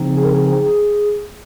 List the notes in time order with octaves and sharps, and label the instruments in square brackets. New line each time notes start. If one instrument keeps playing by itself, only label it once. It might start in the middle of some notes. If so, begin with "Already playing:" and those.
Already playing: [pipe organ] C#3 F3 C4 D#4
[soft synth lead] G#4
A#4
G#4
G#4